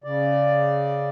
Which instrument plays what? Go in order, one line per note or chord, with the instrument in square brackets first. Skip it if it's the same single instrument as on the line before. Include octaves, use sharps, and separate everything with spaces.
[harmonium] C#3 D5